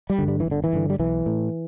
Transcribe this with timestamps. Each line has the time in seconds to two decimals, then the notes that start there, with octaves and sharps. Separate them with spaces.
0.10 G3
0.18 G2 D3
0.28 G3
0.40 E3
0.46 G1
0.51 D3
0.64 E3
0.73 G2 D3
0.90 G3
0.99 B1 E3
1.26 A2